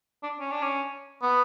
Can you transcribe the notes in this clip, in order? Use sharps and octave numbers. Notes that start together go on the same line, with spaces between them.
D4
C#4
D4
C#4
B3